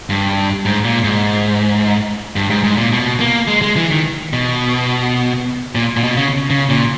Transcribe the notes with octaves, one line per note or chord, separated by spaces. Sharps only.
G2
G#2
A#2
G#2
G2
G#2
G#2
A#2
B2
A#3
G#3
G#3
E3
D#3
B2
A#2
A#2
B2
C#3
C#3
A#2